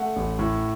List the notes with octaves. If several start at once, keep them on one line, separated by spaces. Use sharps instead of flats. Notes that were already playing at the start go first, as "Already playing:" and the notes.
Already playing: A3 F#5
A1
A2